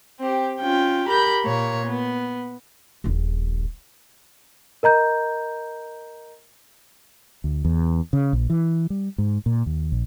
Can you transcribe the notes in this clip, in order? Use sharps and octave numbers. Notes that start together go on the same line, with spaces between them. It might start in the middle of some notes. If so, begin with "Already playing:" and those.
C4 G4
C#4 F4 G5
G4 A#4 B5 G6
A#2 A#3 C#5
B3
D#1 A#1
A#4 D#5 A#5 G6
D2
E2
C#3
A#1
E3
G3
G#2
A#2
D#2
A#1